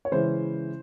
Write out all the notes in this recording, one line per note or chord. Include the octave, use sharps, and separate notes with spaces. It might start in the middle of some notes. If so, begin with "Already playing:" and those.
C#5
C#3 E3 G#3 C#4 E4 C5